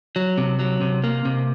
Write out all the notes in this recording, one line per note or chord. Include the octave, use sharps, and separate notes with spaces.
F#3
C3
F#3
C3
A#3
C3